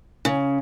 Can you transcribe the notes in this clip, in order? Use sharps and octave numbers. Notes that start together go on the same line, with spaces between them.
C#3